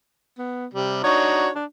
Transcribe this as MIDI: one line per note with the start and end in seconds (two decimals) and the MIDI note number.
0.39 0.66 59
0.74 1.04 48
0.74 1.02 55
1.04 1.48 62
1.04 1.48 63
1.04 1.48 66
1.04 1.50 73
1.55 1.65 62